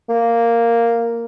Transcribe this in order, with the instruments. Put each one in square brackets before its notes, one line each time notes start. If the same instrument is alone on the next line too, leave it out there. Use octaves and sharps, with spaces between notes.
[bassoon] A#3